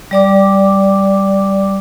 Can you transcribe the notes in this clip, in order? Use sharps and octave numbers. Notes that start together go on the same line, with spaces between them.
G3 D5 D6